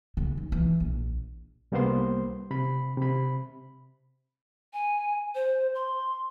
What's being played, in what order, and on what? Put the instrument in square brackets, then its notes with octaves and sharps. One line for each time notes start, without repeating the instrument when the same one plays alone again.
[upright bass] C#3
D#2
E3
A#1
[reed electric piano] C2 G3 A#3 B3 C5 C6
C3 B5
C3 B5
[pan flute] G#5
C5
C6